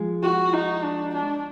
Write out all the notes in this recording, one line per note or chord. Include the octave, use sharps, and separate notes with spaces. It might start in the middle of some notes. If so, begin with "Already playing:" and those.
Already playing: F3 G#3
F#4
D#4
D4
D4